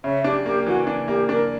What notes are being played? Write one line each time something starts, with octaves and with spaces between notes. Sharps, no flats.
C#3 C#5 E5
D4 G4
A#3 G4
E3 F#4
D4
A#3 G4
D4 A#4